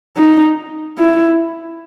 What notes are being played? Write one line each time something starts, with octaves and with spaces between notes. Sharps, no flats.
D#4
E4